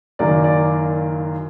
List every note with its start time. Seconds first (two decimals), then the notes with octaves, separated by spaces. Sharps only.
0.19 F#1 F#2 D#3 F#3 A#3 D5
0.44 D5